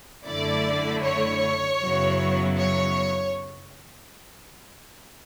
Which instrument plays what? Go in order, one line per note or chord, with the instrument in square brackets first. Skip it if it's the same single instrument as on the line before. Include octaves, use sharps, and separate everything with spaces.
[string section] F#2 D3 A3 E4 D5
C#5
F#2 C#3 F#3 B3 E4
C#5